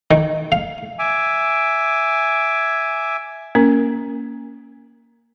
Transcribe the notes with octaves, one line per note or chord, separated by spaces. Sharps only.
D#3
F5
E5 G#5 D6
A#3 C#4 A#4